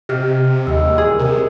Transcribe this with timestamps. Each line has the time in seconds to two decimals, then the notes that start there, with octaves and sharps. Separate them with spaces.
0.09 C3 G4 D#5 F#5 F6
0.67 D#2 G3 G#3 G4 E6
0.98 G#4
1.19 C3 A#4